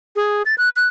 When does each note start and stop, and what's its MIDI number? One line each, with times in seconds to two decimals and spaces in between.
0.16 0.43 68
0.46 0.55 93
0.58 0.69 90
0.76 0.88 90